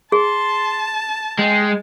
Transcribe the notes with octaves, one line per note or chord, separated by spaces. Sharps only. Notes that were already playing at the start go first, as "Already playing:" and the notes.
G#4 A5 C6
G#3 G5